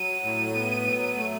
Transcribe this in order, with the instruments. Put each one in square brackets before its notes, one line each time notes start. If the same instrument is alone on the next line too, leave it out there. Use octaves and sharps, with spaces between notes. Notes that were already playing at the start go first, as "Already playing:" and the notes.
Already playing: [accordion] F#3 [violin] D#7
[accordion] A2
B3
F#3
A3